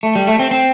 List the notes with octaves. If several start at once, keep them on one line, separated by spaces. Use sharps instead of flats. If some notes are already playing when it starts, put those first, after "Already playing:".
A3
G3
A3
C4
C4